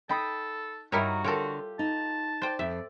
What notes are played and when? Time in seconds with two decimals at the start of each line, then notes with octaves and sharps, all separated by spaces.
0.09 D#4 A4 G5 B5 D#6
0.92 G2 D#4 E4 F#4 G4 A#4 C#5 F#5
1.24 D3 F4 G4 A4 A#4 C#5
1.79 D#4 A5
2.42 C5 D5 G5
2.59 F2 E5